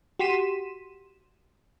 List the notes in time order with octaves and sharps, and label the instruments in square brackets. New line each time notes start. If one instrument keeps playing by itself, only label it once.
[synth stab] F#4 G4 C6 B6 D#7 E7